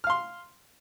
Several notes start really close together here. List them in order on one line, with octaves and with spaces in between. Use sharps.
F6 F5 C6